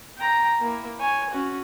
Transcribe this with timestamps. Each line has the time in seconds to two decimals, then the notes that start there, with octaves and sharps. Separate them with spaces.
0.18 G5 A#5
0.60 A#3 E4
0.99 C#5 G#5
1.30 C#4 F#4